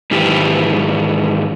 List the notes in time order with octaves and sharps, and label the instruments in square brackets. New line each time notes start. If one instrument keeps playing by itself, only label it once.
[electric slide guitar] G#2 D#3 E3 G4